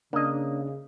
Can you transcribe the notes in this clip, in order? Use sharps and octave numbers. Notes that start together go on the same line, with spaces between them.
C#3 A#3 D4 D#5